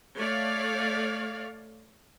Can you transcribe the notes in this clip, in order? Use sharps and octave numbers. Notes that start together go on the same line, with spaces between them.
A3 C#5 D5 F5